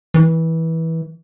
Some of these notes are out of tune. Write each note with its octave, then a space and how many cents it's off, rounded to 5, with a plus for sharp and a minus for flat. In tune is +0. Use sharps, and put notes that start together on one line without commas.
E3 -20